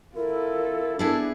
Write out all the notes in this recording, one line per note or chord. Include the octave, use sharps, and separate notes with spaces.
E4 F4 A4 A#4
B3 D4 E4 G#4 A4 B4